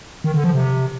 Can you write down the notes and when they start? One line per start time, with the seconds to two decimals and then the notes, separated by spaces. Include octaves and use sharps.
0.24 D#3
0.34 D3
0.44 F3
0.53 C3